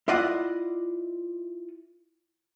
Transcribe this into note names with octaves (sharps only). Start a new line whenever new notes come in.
E4 F4 D5 D#5 F#5